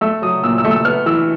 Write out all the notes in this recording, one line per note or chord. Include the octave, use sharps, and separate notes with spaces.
A3 E6
F#3 D#6
A#2 E6
E6
A3
E6
B3 F6
E3 E6